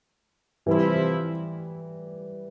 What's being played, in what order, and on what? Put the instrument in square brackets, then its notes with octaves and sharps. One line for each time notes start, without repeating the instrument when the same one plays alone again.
[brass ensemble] C3 F3 C4 E4 [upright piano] E3 G3